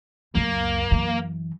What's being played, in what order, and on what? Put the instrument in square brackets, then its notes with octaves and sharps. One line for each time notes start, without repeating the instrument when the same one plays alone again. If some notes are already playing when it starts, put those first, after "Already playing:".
[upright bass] C#2 F#2 [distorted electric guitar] A#3
[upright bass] F#2 E3